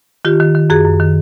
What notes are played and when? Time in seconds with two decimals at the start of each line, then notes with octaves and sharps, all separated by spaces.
0.25 D#3 F4 G4
0.40 D#3
0.55 D#3
0.70 F#2 F#4 G#4
0.85 F#2
1.00 D#3